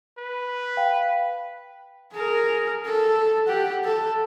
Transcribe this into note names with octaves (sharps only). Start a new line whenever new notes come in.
B4
F5 G5
G#4 A#4
A4
G4 F#5
A4